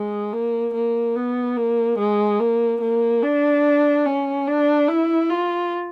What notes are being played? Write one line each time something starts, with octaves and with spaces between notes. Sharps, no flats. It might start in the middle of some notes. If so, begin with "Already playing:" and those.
Already playing: G#3
A#3
A#3
B3
A#3
G#3
A#3
A#3
D4
C#4
D4
E4
F4